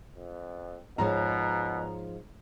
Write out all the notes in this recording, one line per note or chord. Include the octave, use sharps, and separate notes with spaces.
F2
G#2 B2 F3 G#3 C#5 A#5